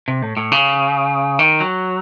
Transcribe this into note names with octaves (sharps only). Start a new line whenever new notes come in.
C3
A2
A2
C#3
D#3
F#3